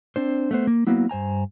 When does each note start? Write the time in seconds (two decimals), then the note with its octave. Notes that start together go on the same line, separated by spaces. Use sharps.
0.16 C4 D4 C5
0.51 A3 B3 C5
0.67 A#3
0.87 F#3 A#3 B3 E4
1.09 G2 C5 G#5 A#5